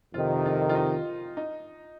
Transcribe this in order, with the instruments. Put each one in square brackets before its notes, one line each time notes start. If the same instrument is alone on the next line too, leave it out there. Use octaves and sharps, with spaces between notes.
[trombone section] F2 C3 D#3 [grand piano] F4
[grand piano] F4
F4
D#4
D#4